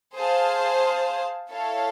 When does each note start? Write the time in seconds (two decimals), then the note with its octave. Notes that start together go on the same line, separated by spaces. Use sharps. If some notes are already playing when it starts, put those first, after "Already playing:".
0.16 G#4 C5 F5 A5
1.50 E4 A4 C#5 F5 A5